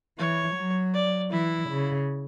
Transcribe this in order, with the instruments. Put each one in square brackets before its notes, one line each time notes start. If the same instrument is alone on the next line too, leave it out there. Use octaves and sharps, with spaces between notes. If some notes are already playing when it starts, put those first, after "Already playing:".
[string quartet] E3 [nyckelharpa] C#5
[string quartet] F#3
[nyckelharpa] D5
[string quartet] E3 [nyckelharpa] E4
[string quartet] C#3